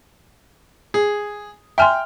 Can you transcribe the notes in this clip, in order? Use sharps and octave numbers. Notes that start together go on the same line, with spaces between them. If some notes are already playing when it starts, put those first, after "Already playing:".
G#4
E5 G5 G#5 C6 F6